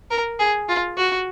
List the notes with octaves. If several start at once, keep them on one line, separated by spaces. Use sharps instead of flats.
A#4
G#4
F4
F#4